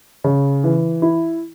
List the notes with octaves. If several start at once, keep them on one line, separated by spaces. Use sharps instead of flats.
C#3
E3
E4